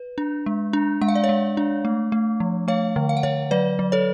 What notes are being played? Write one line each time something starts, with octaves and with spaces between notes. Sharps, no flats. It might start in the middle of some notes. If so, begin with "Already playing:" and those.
Already playing: B4
D4
G#3
D4
G#3 F#5
F5
D5
C#5 F5
G#3
D4
A3
A3
F3
A3 C#5 F5
D3
F5
F#5
D3 C#5 F5
F#3 B4 D5
F#3
A4 C#5